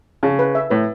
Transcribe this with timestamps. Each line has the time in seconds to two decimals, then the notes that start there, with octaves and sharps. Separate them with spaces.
0.23 C#3 A5
0.39 B4
0.55 E5
0.70 A2 B4